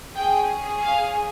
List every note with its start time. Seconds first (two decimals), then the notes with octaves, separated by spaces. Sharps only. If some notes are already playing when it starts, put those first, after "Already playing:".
0.15 C#4 G#4 G5
0.82 F5